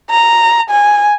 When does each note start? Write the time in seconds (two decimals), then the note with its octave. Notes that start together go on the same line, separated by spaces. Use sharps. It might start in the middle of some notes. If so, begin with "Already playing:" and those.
0.10 A#5
0.70 G#5